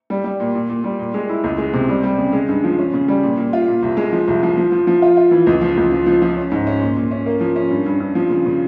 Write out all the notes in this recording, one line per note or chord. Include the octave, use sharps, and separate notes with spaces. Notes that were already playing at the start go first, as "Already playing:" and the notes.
G3
G3
A#2
A#2
A#2
G3
A#2
G#3
E4
C#2
G#3
C3
G3
G3
C#3
G#3
G2
F3
C#4
C#3
G3
A#2
A#2
F4
A#2
C2
G#3
F3
C2
F3
F3
F3
F3
F4
F4
E3
C#2
F3
C#2
F3
F3
F3
C#4
G#2
C#4
A#2
A#2
C#4
A#3
F3
C#4
G2
G2
G2
F3
C#3
C#3